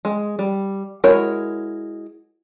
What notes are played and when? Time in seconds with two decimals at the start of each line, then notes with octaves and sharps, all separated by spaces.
0.05 G#3
0.39 G3
1.04 G#3 E4 F#4 A#4 C#5